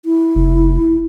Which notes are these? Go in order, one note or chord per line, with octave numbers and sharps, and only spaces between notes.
E4
F1